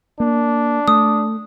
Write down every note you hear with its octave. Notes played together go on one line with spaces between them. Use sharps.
A#3 D4
A3 D#6